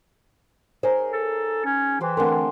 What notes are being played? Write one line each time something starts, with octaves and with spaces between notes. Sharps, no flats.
D#4 G#4 A#4 C5 C#5
A4
C#4
E3 G4 C5
D3 A3 C4 A#4 G#5 C6